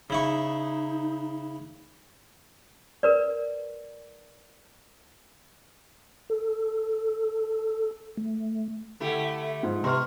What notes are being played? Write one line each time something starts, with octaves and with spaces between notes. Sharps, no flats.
C#3 D#4 E4 C#6
A#4 B4 D5
A4
A3
D3 A3 E4 G4
G#2 F3
C3 B3 C6 C#6 F6